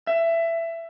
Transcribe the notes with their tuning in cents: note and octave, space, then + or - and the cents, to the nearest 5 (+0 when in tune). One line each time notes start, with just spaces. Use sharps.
E5 +15